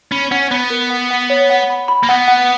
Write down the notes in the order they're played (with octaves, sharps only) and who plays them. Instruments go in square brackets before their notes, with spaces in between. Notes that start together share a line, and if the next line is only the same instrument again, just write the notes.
[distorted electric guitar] C#4 [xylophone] B5
[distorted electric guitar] C#4 [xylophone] F#5
[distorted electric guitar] B3 [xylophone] B5
[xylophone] A#4
F#5
F#5
C#5
F#5
B5
B5
[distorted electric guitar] A#3
[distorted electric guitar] B3 [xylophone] F#5
[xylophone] F#5